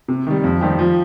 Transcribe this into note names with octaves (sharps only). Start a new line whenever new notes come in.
C3
D#3 G3
F2
D#3 G3 C4 G4
F3